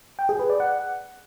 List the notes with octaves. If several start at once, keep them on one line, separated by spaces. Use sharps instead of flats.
G5
G#4
B4
D5
F#5